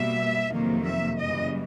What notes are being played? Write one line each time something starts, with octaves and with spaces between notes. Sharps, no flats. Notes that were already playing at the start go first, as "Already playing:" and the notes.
Already playing: B2 G3 A#3 E5
F2 C3 D#3 F#3 A#3
E5
F#2 C#3 E3 G3 A#3 D#5